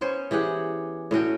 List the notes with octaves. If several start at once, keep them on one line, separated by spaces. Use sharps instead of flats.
B3 C#4 C5 C#5
E3 G4 G#4 F#5
A2 C#4 F#4 G5